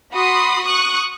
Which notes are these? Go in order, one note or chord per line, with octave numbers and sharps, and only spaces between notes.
F#4 B5 C6 D#6
C#6 D#6 F#6